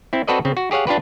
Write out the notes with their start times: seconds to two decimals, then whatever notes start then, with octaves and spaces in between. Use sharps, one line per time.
0.13 C4 E4
0.27 C4 F#4 A4 B4 D5 D#5
0.45 C#3 C4
0.57 F#4
0.71 G4 G#4 C#5 F5 F#5
0.87 D4 F4 G4 B4